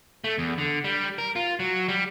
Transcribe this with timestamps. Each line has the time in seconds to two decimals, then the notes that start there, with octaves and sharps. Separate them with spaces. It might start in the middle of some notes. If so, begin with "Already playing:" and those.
0.24 A3
0.38 E2
0.58 D3
0.84 G3
1.19 A#4
1.36 F4
1.60 F#3
1.88 G3